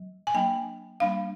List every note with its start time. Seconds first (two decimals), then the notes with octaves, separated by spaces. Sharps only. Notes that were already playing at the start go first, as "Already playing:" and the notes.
Already playing: F#3
0.27 G#5
0.34 F#3 A#3 D4 G5
1.00 G3 A#3 D4 F5